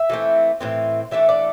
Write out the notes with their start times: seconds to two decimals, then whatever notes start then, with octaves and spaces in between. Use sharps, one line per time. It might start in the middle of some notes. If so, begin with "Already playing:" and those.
Already playing: E5
0.10 E3 A3 C4
0.61 A2 E3 C4
1.11 E3 A3 D4 E5
1.29 D5